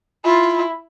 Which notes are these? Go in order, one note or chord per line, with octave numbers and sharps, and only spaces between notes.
E4 F4